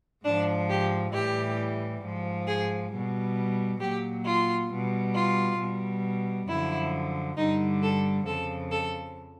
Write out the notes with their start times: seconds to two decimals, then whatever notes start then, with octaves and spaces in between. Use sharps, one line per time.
0.23 G#2 F3 D4
0.69 G4
1.13 A2 E3 G3 G4
2.02 G#2 F3
2.47 G#4
2.91 B2 G3
3.80 A#2 F#3 G4
4.25 F4
4.70 B2 G3
5.14 F4
5.58 B2 G3
6.48 F#2 D3 F3 E4
7.37 G2 D3 G3 D#4
7.82 A4
8.26 F2 C#3 F3 A4
8.71 A4